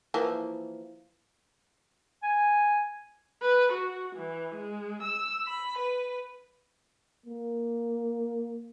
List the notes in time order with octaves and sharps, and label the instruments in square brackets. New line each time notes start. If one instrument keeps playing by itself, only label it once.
[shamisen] E3 F3 A#3
[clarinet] G#5
[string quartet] B4
F#4
E3
G#3
E6
B5
B4
[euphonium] A#3